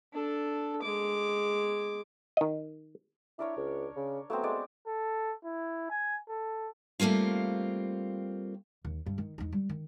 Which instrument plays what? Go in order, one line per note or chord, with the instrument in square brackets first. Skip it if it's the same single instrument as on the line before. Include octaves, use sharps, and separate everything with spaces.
[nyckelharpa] D4 A4
G#3 D6
[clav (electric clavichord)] D#3 D#5
[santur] D4 A#4 C#5 [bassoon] E4
[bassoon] C#2
C#3
[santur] F#3 B3 C4 [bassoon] A3
[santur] G#3 D5
[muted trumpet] A4
E4
G#5
A4
[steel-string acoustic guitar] G3 A3 A#3 C4 F4
[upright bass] D#2
G2
D#3
E2 D#4
G3
D#3